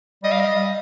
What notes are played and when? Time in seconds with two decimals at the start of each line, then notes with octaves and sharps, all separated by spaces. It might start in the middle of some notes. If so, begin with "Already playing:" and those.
0.23 G3 D#5
0.31 F5
0.40 D#5
0.47 G3